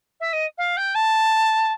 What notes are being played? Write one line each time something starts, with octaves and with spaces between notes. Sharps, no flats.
E5
D#5
F5
G5
A5